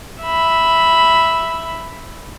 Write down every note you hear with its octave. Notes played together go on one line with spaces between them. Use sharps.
E5 B5